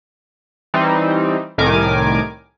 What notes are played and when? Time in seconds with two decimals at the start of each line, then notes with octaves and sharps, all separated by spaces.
0.74 E3 G3 C4 D#4
1.58 C2 A2 D#3 A#4 G#5 D6